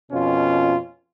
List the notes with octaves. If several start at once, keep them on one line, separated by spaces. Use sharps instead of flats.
F2 B2 C#4 F4